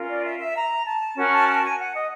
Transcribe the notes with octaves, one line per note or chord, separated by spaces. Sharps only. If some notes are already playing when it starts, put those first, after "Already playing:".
Already playing: C#4 F4 A#4
D5
E5
E5
A#5
A5
C#4 F#4 A#4
A5
A5
G#5
F#5
D#5